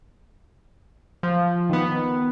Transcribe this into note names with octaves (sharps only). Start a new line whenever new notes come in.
F3
D#3 B3